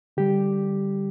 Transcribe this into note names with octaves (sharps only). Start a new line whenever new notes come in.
D3 G3 G4